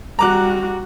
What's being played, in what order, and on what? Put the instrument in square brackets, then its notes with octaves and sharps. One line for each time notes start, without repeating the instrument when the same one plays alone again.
[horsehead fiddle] G3 F#4 [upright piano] A#5 D6 F#6